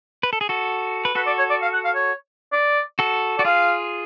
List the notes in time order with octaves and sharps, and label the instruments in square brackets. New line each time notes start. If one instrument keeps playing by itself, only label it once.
[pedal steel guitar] B4
A4
G#4
F#4 A4
B4
[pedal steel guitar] F#4 A4 [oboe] B4
[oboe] D5
C#5
D5
F5
F#5
F5
C#5
D5
[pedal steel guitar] F#4 A4
[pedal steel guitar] F#4 [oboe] D5
[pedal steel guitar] F4 G#4 [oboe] F5